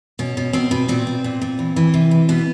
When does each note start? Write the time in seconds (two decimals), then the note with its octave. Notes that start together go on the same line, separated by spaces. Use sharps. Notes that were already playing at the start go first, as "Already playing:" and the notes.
0.19 B2 C#4
0.37 B2
0.53 B2 C4
0.71 B2
0.88 A#2 C4
1.07 A#2
1.24 A#2
1.41 A#2
1.59 E3
1.76 E3
1.94 C3
2.11 E3
2.29 B2 B3